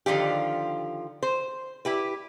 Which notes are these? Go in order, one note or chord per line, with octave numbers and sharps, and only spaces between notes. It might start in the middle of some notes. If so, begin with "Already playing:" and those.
D3 D#3 F3 F4 G4
C5
E4 G4 B4